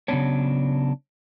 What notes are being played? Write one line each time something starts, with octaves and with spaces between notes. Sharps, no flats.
C#3 F#3 B3 D4 C#5